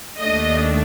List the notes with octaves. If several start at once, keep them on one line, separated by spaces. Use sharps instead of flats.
D#2 D#3 A3 D4 D#5